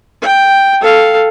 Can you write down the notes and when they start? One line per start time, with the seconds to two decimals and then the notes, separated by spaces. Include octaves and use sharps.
0.22 G5
0.80 A4 F5